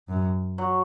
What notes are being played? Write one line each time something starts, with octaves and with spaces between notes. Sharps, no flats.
F#2
F#3